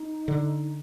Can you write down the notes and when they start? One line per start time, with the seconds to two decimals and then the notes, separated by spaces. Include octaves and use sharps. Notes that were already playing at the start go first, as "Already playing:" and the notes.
Already playing: D#4
0.28 D3